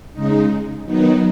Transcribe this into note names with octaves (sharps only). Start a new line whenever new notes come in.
C#3 G#3 D#4
D#3 F#3 B3 D#4